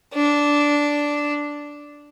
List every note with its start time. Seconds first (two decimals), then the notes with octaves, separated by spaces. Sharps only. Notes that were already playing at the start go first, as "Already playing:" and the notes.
0.13 D4